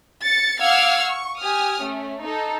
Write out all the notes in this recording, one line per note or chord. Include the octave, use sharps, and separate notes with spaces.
A6 C#7
F5 F#5 D6 E6 F6 G#6
C#6
G4 G#5 D#6 F6
A3 C#4
D#4 A4